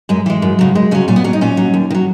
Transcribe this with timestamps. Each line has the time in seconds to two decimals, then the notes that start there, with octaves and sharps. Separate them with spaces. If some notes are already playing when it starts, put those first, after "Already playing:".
0.09 F#2 G#3
0.26 E3 G#3
0.42 F#2
0.59 C#3 F#3
0.75 F#2 G#3
0.91 C#3 F#3 C#4
1.08 A#2 C#4
1.16 B3
1.24 F#3 C#4
1.33 D#4
1.41 A#2 C#4
1.57 F#3
1.74 D#2
1.90 D#3
1.95 F#3